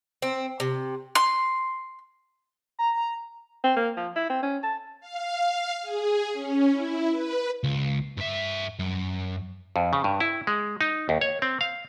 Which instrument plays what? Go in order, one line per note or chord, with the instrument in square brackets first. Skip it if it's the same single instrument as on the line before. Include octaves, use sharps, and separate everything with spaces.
[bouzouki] C4
C3
[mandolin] C6
[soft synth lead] A#5
[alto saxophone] C4
A#3
F3
E4
C4
C#4
A5
[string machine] F5
G#4
C#4
E4
B4
[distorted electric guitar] C#2
G2 E5
F#2
[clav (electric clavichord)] F2
C#3
G2
E4
G#3
D#4
D#2
C#5
C4
F5